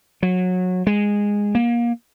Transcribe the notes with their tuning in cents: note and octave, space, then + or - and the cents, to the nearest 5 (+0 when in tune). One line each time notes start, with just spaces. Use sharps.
F#3 -20
G#3 -10
A#3 +25